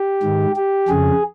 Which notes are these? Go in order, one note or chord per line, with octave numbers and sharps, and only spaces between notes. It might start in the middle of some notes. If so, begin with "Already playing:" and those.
Already playing: G4
G#2 D#3
G4
F2 C#3 G#4